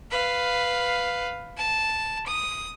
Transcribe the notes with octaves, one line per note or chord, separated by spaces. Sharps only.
B4 F5
A5
D#6